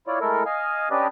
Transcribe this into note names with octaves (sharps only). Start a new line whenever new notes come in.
E4 F4 C#5 D5
G#3 A3 E4 A4 A#4
D#5 F5 G#5
C#4 D4 G4 B4 D5 D#5